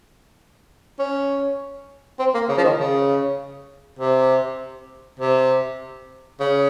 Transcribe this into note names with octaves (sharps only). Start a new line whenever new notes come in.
C#4
C4
A#3
C#3
F3
D#3
C#3
C3
C3
C#3